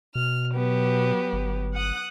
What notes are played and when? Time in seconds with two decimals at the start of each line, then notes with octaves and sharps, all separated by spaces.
0.15 B2 F6
0.55 F#3 B3 G4
1.33 G1
1.74 F#5 D#6 F#6